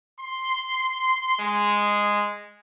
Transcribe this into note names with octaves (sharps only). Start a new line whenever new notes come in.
C6
G#3